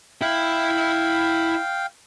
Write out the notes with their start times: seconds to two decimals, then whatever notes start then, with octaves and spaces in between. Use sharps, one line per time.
0.21 E4 E5 F5 G5